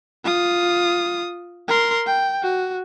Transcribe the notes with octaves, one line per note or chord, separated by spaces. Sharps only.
F4 D#6
A#4 C6
G5
F#4